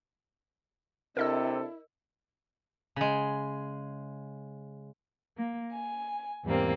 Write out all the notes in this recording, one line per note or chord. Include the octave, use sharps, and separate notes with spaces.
C3 C4 D4 E4 A4 A#4 D#5 E6
C#3 G#3
A#3
G#5
E2 G#2 G3 A#3 C4